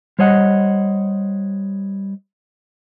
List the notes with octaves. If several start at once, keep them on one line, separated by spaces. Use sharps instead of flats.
G3 C5 C#5 D#5 F#5